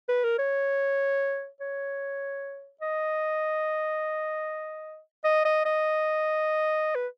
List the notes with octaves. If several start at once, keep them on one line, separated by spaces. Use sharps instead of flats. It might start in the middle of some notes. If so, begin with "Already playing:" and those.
B4
A#4
C#5
C#5
D#5
D#5
D#5
D#5
B4